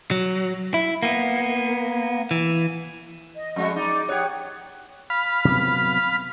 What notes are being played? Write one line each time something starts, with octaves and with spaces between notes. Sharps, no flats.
F#3
E4
A#3 B3
E3
D#5
F2 G#3 F#4 D#5 C#6
D#4 D5 D6
G4 C#5 F#5 D#6 F#6
F5 B5
C3 F#3 B3